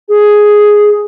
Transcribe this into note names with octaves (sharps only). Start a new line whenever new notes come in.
G#4